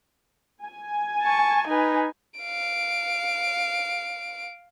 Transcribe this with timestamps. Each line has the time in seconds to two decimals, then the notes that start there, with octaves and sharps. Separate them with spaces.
0.64 G#5
1.22 A5 C#6
1.67 D#4 B4
2.40 F5 D7